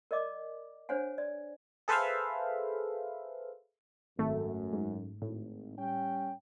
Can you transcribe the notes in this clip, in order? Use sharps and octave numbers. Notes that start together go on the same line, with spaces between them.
A#4 D5 D#5 D6
D4 C5 C#5 F#5 G#5
D5
G#4 A4 B4 C5 E5 F5
G#1 F#2 A3
G#2
G#1 A2
G3 C#4 G5